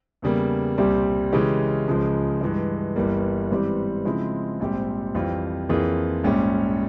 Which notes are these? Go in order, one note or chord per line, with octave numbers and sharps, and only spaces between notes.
E2 C#3 G3 A#3
C2 A#2 G3 C4 G4
C#3 E3 G#3 C#4 G4
C#2 C#3 F3 G#3
G2 E3 G#3
G1 G2 E3 G3 A#3
G#2 E3 G3 C4 G4
C#3 F3 G#3 C4 E4
A#1 G#2 G3 C4 G4
F2 E3 G3 C4 F4
F2 E3 A#3 F4 G#4
A#1 G#2 G3 C#4 G4